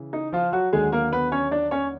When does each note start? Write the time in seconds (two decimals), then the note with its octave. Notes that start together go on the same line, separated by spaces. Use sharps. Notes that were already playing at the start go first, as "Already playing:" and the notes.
Already playing: C#3 E3
0.13 D#4
0.32 F3 F4
0.52 F#3 F#4
0.73 D#2 D3 F#3 G#3 G#4
0.92 A#3 A#4
1.12 B3 B4
1.32 C#4 C#5
1.51 D4 D5
1.71 C#4 C#5